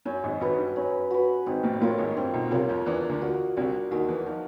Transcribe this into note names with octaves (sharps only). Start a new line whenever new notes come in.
F#2 C#4
G#1 G#2
G#1 G#2 F#4 B4
G2
F#2 C#4
F#4 B4
G#1 G#2 C4
A1 A2
A#2
A1 A2 F4 A#4 C#5
G#1 G#2
G2 C4
B1 B2
B2
C2 C3 F4 A#4 C#5
F2 F3
E2 E3 D4
D2 D3
F#4 A#4 D#5
C2 C3 D4
D#2 D#3 F#4 A#4 D#5
E2 E3
F3 D#4